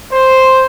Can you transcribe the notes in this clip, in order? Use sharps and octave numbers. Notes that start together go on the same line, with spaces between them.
C5